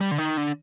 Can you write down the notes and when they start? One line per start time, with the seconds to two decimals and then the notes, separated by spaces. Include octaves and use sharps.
0.01 G3
0.11 D3
0.18 D#3
0.37 D3